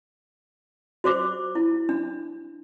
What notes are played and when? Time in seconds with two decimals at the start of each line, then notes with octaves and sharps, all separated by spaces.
1.04 F#4 C5 D6
1.55 E4
1.89 D4